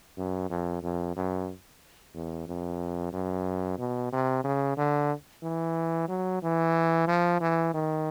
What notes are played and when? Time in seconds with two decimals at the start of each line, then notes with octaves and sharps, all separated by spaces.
0.18 F#2
0.50 F2
0.83 F2
1.16 F#2
2.15 E2
2.47 F2
3.13 F#2
3.79 B2
4.12 C3
4.44 C#3
4.77 D3
5.43 E3
6.09 F#3
6.43 E3
7.08 F3
7.41 E3
7.74 D#3